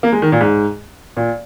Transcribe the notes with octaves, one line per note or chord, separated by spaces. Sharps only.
A#3
G#3
D#3
A#2
G#2
A#2